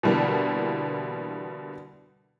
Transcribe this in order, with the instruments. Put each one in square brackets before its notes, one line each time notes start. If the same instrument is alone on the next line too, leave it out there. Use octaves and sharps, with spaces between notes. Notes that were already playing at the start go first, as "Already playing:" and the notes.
[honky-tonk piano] B2 D3 E3 G3 A#3